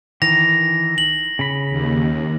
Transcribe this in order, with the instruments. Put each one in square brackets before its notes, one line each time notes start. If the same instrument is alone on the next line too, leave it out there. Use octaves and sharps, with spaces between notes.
[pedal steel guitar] D#3 E3 [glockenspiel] A#6 F7
[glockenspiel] F#7
[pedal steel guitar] C#3 B5
[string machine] D#2